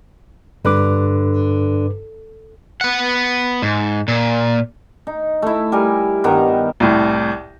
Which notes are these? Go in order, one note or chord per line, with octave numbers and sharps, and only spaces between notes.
G2 D3 B4 D6
B3 F#5
G#2
A#2
D#4
A3 E4
G3 A#4 G#5
G2 D#3 B3 A#5
C2 A2